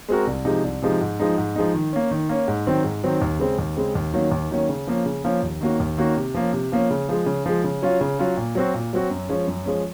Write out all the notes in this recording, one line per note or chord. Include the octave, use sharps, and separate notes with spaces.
G#3 C4 F#4 A#4
C2
C3 F3 G#3 D#4
C2
C3 F3 G#3 D#4
G#2
F3 G#3 D#4
G#2
F3 G#3 D#4
D#3
A#3 C#4
D#3
A#3 C#4
G#2
D#3 F#3 C4
G#2
D#3 F#3 C4
D#2
C#3 G#3 C4
D#2
C#3 G#3 C4
D#2
D#3 F#3 A#3 C#4
D#2
D#3 F#3 A#3 C#4
C#3
F3 A#3 C#4
C#3
F3 A#3 C#4
D#2
D#3 A#3 C#4 F#4
D#2
D#3 A#3 C#4 F#4
C3
F3 A#3 C#4
C3
F3 A#3 C#4
C#3
F3 G#3
C#3
F3 G#3
C#3
F#3 C#4 F4
C#3
F#3 C#4 F4
A#2
F#3 C4 F#4
A#2
F#3 C4 F#4
F#2
F3 G#3 C#4
F#2
F3 G#3 C#4